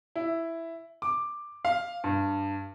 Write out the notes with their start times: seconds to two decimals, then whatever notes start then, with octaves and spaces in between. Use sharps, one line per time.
0.16 E4
1.02 D6
1.65 F5
2.04 G2